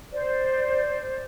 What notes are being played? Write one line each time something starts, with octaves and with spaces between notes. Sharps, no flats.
C5 D5